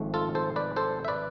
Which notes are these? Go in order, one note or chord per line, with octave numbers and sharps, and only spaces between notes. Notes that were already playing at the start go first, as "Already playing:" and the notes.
Already playing: G#1 G#2 F3 A3
F4 A4
A4 C5
B4 D5
A4 C5
E5
B4 D5